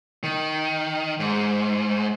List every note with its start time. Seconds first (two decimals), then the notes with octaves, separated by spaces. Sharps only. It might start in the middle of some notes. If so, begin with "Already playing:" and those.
0.23 D#3
1.20 G#2